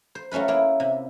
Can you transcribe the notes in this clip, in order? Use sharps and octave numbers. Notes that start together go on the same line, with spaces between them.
C5
F#3 A3 C#4 F4 B4
A#3 E4
C3